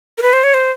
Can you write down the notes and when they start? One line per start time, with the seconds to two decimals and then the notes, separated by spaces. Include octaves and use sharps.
0.18 A#4
0.22 B4
0.33 C5
0.44 C#5
0.54 C5